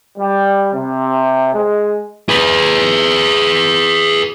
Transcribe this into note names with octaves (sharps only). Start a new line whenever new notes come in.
G3
C3
G#3
G#4 B4